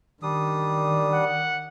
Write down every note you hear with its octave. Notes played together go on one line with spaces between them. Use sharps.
D#3 G3 D4 D#6
F#5